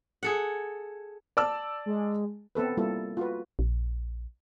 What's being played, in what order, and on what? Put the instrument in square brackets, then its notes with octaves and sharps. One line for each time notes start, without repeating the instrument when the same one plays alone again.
[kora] G#4 A4 F#5
[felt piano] D5 A5 E6
[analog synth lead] G#3
[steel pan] B3 C4 A4 B4
G3 A#3 E4 F4 A4
F4 F#4 B4
[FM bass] A#1